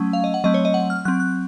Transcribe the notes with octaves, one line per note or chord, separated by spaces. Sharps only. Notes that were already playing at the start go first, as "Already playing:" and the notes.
Already playing: F#3 A3 C#4
F5
D#5
F#5
F#3 A3 C4 D#5
C#5
D#5
F#5
F6
F#3 C4 F#6
F#6